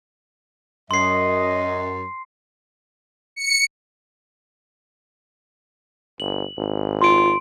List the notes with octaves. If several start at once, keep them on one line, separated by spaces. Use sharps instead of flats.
F#2 D#5 C6 C7
C#7
G1 F#7
G#1
F4 C6 D7